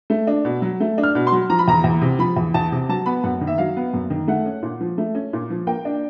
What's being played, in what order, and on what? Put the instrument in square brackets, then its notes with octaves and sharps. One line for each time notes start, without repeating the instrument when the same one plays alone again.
[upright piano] A3
D4
B2
F#3
A3
D4
F6
B2
C6
F#3
F3 A#5
B5
E2 A#5
E2
C3
F3 B5
E2
E2 A5
C3
F#3 A5
B3 B5
F#2 F#5
D#3
E5
F#3 F5
B3
F#2
D#3
A3 F#5
C#4
A#2
F3
A3
C#4
A#2
F3
A#3 G5
D4